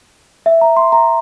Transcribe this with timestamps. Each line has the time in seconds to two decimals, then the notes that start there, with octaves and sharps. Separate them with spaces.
0.46 E5
0.61 A#5
0.77 C6
0.92 A#5